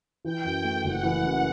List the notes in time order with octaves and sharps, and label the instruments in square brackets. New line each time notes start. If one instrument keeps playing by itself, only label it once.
[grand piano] E3 [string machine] G5
[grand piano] F#2
A3
[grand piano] F#1 [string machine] F#5
[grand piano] E3
F#2